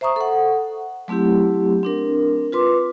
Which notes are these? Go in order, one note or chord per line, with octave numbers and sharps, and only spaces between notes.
C5 E5 A#5 C#6 D#6
A4 F#5
F#3 A3 C4 E4 G4
C4 D4 A#4
F4 B4 C6 D6